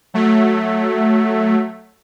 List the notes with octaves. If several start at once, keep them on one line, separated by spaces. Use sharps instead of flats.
F#3 A3